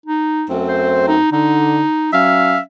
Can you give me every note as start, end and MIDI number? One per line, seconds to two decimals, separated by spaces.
0.06 0.47 63
0.49 1.20 42
0.49 1.20 57
0.49 1.20 60
0.69 1.06 72
1.08 1.31 63
1.32 1.82 50
1.32 2.12 63
2.13 2.58 54
2.13 2.60 61
2.13 2.58 76
2.13 2.58 77